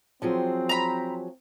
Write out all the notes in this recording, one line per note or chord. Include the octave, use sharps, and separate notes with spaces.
F3 F#3 C4 G#4
A#5 B5